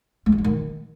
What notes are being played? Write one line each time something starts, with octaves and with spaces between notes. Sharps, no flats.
A3
F4
A3
D#3